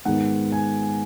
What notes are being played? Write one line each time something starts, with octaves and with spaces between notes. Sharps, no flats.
G#2 D#3 G#3 B3 F#5
G#5